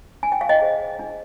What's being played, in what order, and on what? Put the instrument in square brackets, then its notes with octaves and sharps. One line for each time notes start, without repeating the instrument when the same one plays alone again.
[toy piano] D4 G#5
G5
F5
D#5 G5
G#4 C5
D4